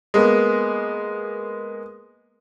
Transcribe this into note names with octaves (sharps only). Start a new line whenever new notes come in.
G#3 A#3 B3